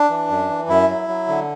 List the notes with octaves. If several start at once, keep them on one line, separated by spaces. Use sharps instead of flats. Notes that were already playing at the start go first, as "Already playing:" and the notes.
Already playing: D4
E3
F#2
E3
F#2 E4
F#3
F#3
D3